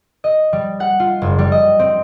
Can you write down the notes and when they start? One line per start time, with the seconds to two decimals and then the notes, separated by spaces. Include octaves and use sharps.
0.24 D#5
0.53 G3
0.80 F#5
1.00 F4
1.22 F#1
1.39 G3
1.52 D#5
1.79 C4